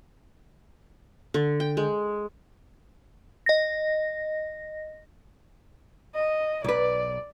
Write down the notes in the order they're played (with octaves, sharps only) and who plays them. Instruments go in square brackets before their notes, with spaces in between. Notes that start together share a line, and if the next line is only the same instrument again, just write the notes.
[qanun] D3
G5
G#3
[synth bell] D#5 A#6
[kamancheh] D#5
[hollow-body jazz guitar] B1 B4 [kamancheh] D5